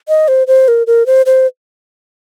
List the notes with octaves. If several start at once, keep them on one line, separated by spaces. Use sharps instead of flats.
D#5
C5
C5
A#4
A#4
C5
C5